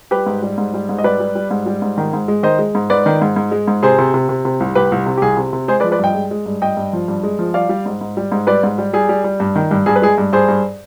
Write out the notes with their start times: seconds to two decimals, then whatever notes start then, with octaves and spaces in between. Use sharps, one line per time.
0.11 G3 G4 B4
0.26 G#2
0.42 G3
0.58 G#2
0.74 G3
0.89 G#2
0.98 D#5
1.04 G3 B4 D5
1.20 G3
1.35 G3
1.51 G#2
1.66 G3
1.82 G#2
1.98 D#3
2.13 G#2
2.28 G#3
2.43 D#3 C5 D#5
2.59 G#3
2.75 G#2
2.90 G#2 B4 D5
3.06 D#3
3.22 G#2
3.36 G#2
3.51 G#3
3.68 G#2
3.83 C3 G#4 C5
3.99 C3
4.14 C3
4.29 C3
4.45 C3
4.60 C2
4.75 C2 G4 B4
4.92 C2
5.06 C3
5.17 G4
5.22 C2 G#4
5.37 C3
5.53 C3
5.68 G#3 G#4 C5
5.80 B4 D5
5.84 F3
5.92 B4 D5
5.99 G2 D#5 G5
6.15 G#3
6.31 G#3
6.46 G2
6.62 G2 D#5 G5
6.77 G2
6.93 F3
7.08 G2
7.23 G#3
7.39 F3
7.54 G3 D5 F5
7.69 G3
7.86 G#2
8.01 G#2
8.17 G3
8.32 G#2
8.47 G3 B4 D5
8.63 G#2
8.78 G3
8.93 G3 G#4
9.09 G3
9.24 G3
9.40 G2
9.56 D#3
9.71 G2
9.86 G2 G#4
9.96 B4
10.02 G#3 G#4
10.18 G2
10.33 G2 G#4 C5
10.48 G2